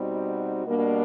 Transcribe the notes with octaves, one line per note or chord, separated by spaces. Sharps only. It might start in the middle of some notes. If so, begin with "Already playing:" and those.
Already playing: B2 G3 C4 D#4 F#4
B2 G3 A#3 D4